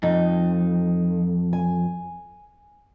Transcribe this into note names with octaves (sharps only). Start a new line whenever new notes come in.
F2 D#4
G#5